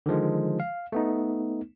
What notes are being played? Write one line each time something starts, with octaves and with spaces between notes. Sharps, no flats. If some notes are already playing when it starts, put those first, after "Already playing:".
D3 D#3 F3 G#3
F5
A3 B3 D#4